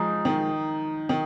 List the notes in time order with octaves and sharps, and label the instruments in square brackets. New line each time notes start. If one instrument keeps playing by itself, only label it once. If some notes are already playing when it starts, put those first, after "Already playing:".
Already playing: [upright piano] F3 G#3 [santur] D#4
[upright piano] D#3
D#3